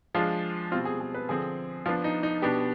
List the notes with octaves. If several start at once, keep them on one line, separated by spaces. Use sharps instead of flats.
F3 G#3 D4 F4
B2 G3 C4 F4
G#4
G#4
B4
D3 F3 C4 G#4
F3 B3 D4 F4
D#4
D#4
B2 B3 D4 G4